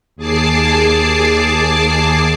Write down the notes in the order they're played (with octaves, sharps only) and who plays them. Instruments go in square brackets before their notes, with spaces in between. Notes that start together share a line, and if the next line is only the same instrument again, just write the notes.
[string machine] D#2 G#4 A5 D6 C7